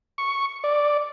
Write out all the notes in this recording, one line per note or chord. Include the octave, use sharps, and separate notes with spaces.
C#6
D5